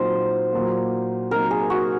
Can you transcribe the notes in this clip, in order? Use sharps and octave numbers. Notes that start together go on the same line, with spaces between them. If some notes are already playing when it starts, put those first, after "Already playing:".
Already playing: A#2 F#3 C4 D#4 C5
A#2 F#3 A#3
C3 F#3 A#3 D#4 A#4
G#4
F#4